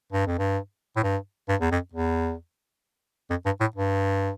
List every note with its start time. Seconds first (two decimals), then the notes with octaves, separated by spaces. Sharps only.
0.12 G2
0.26 F2
0.38 G2
0.96 A2
1.03 G2
1.49 G2
1.61 E2
1.71 F2
1.93 E2
3.30 F2
3.46 G2
3.60 A2
3.76 G2